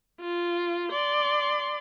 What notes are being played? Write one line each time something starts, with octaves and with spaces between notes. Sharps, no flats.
F4
D5 C6